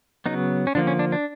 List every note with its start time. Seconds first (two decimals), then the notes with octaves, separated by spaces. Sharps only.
0.26 C#3 F#3 B3 D#4
0.67 C#4
0.75 D3 F3 A#3 D4
0.87 C#4
0.99 D4
1.12 D4